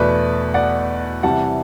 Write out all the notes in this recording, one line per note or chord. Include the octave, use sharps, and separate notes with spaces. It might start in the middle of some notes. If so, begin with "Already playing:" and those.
Already playing: E2 B2 A3 B4 D5
D5 F#5
C3 E3 G3 F#5 A5